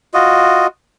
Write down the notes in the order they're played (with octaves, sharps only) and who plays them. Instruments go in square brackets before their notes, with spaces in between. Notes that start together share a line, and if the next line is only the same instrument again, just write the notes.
[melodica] F4 F#4 D#5